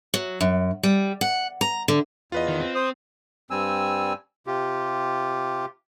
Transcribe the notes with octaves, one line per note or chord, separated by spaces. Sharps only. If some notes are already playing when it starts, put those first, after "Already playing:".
F#3
F#2
G3
F#5
A#5
D3
E2 F4 B4 D#5
D#3
C4
C5 D#6
G2 G3 C4 G#5 E6
C3 F4 G4